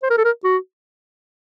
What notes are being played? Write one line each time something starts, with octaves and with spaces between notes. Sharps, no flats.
C5
A#4
A4
A#4
F#4